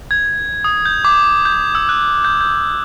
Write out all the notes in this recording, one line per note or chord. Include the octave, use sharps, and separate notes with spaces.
G#6
D#6
G6
D6
G6
E6
F#6
G6
G6